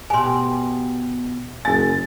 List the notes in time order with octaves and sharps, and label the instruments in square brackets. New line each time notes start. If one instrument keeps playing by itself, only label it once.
[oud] B2 G4 [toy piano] G#5 C6
[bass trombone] F#1 [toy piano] G#5 [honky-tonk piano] A6